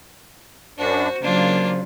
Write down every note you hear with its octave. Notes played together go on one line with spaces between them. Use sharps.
F#2 D4 F#4 C5
C#3 F#3 A#3 D4 F4